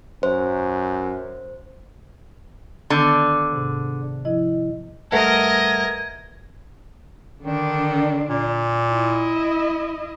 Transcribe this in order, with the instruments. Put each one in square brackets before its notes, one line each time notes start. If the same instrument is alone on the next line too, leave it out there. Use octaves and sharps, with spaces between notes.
[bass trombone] F#2 [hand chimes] C5
[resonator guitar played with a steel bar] D3 [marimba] D#3 B3 G6
[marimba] G#2 C3
F3 E4 D#5
[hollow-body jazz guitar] G2 A3 [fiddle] A#4 D#5 [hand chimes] B4 E5 F#5 [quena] G#6
[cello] D3 D4 [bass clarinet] D#3
[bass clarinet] A#2
[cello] E4 D#5